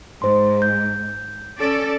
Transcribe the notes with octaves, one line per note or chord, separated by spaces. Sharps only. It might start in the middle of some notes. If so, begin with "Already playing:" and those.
G#2 C5 C6
G6
C#4 A4 D5